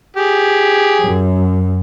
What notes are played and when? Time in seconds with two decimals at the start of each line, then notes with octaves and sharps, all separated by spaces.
0.16 G4 G#4
1.02 F#2